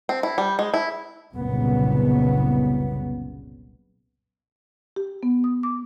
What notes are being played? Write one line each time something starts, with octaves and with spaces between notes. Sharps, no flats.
C4
E4
G3
G#3
E4
F#1 C2 A#2 C#3 B3
G4
B3
D#6
D6